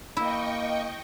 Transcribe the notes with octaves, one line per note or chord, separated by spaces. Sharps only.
A#3 E4 D#5 G5 C#6